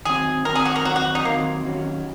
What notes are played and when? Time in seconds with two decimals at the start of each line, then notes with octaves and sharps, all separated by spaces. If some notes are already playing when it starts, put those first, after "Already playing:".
0.05 D#3 F#3 C4 G#4
0.45 D#3 F#3 C4 A#4
0.55 G#4
0.65 F#4
0.76 A#4
0.85 D#3 F#3 C4 F#4
0.96 F#4
1.15 D#4
1.25 D#3 F#3 A#3 C4
1.64 D#3 F#3 C#4